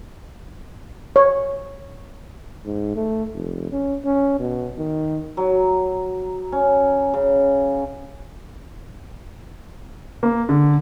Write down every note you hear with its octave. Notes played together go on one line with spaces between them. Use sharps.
C#5
G#2
A3
F1
C#4
C#4
B2
D#3
F#3
C#4
C#3
A#3
D3